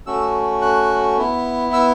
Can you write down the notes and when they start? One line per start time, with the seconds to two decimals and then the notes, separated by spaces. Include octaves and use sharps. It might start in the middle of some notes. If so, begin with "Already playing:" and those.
0.06 A3 C#4 F#4 E6
0.62 F#6
1.18 B3 E4
1.73 E6